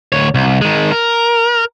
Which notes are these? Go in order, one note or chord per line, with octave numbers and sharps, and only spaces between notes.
D2 C#5
C2
D#3 G#3
A#4